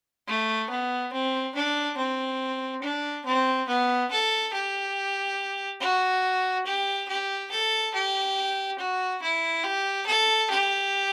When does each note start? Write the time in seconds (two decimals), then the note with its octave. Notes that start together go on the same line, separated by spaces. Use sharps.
0.27 A3
0.69 B3
1.12 C4
1.54 D4
1.97 C4
2.82 D4
3.25 C4
3.68 B3
4.11 A4
4.53 G4
5.80 F#4
6.66 G4
7.08 G4
7.51 A4
7.94 G4
8.78 F#4
9.22 E4
9.64 G4
10.06 A4
10.50 G4